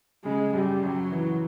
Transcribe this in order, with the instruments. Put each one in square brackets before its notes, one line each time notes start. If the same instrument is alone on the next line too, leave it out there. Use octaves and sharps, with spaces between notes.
[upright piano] C#3 [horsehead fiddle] G#3
[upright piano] F#2 [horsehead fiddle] G3
[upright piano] F#2 [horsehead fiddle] F#3
[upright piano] E3